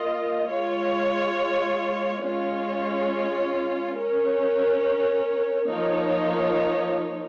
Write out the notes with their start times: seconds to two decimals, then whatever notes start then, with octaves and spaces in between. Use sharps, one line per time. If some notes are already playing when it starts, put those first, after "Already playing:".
Already playing: A#3 F4 A#4 D#5
0.49 G#3 F4 C#5
2.22 G#3 C#4 F4 C#5
3.96 C#4 A#4 C#5
5.68 F3 A#3 D#4 C#5